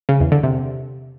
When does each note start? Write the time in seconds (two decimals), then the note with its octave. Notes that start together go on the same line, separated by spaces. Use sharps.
0.09 C#3
0.20 E2
0.32 D3
0.43 C3